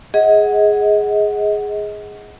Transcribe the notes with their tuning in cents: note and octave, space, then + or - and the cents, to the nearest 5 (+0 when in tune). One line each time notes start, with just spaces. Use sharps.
G#4 +0 D#5 +30 F#5 -5